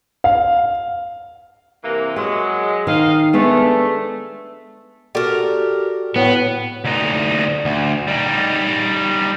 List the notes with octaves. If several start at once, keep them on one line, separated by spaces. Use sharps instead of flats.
F5
C3 E3 A#3
F#3 G#3 F#5
D#3 D#5 F5
G#3 A3 B3 D4
F#4 G4 A4 A#4 D5
A2 B3
D2 D#4
D2
G3 D#4